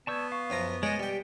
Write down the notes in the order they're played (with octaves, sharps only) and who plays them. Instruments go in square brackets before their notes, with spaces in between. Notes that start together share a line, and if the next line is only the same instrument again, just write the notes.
[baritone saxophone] B3 [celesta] D5 G6 G#6 [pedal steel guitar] A5 C#6 E6
[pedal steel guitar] F5 [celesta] C#6
[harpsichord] F#2 F3 A#5
[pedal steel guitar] G#3 [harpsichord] C#5 D#5 [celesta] A6 C#7 D7
[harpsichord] G3 G5 [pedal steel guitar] G4